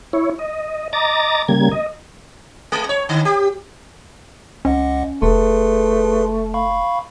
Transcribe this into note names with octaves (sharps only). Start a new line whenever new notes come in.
E4 C#5
D#5
D#5 A#5 D6 A6
C#3 G3 A#3 G#6
D#5
G#3
C#5
D3
G4
C#2 C#4 D#5 F#5
F1 A3 G#4 B4 C6
F5 B5 C#6